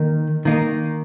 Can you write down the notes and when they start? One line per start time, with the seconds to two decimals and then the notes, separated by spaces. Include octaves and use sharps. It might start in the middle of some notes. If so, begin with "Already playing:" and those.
Already playing: D#3 A#3 D#4
0.45 D#3 A#3 D#4